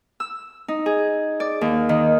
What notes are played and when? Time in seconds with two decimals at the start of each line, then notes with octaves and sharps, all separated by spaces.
0.20 E6
0.68 D#4
0.86 G#4
1.40 D5
1.61 D#2
1.89 D#3